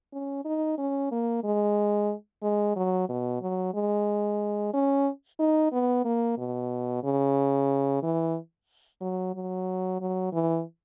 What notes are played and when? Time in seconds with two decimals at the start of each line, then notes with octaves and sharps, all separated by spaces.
0.13 C#4
0.45 D#4
0.78 C#4
1.11 A#3
1.44 G#3
2.42 G#3
2.76 F#3
3.09 B2
3.41 F#3
3.74 G#3
4.73 C#4
5.39 D#4
5.72 B3
6.05 A#3
6.38 B2
7.04 C#3
8.02 E3
9.01 F#3
9.34 F#3
10.00 F#3
10.33 E3